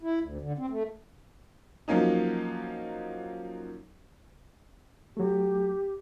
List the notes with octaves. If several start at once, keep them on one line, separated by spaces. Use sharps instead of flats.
E4
D2
D3
C4
A3
F3 F#3 A#3 C#4 D#4
F#3 A3 G4